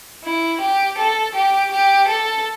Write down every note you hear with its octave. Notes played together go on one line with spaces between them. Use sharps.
E4
G4
A4
G4
G4
A4